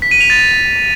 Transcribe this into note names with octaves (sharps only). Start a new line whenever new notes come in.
B6
D#7
F7
A6